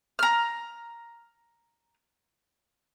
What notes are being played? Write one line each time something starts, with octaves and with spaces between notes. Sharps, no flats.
A#5 F6